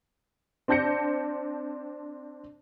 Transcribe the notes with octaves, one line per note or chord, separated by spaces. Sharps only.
C4 D4 A5 G6 A#6 C#7